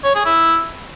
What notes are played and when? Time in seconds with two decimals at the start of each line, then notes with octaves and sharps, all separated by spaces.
0.04 C#5
0.15 G#4
0.25 E4